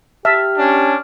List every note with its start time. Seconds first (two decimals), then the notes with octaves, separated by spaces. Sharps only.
0.25 G4 E5 A5 F6
0.57 C#4 D4